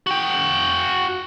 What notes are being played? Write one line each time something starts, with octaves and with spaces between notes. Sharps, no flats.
F#4 G5